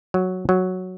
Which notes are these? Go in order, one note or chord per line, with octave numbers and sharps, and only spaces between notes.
F#3
F#3